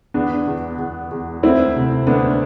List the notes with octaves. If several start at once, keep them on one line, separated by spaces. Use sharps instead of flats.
E2 B3 D4
E2
E2
E2
D2 C4 E4
C3
D2 B3 D4